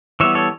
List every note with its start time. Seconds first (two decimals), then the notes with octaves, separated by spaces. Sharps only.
0.20 E3 G3 B3 C#5 E5
0.35 A4 C#5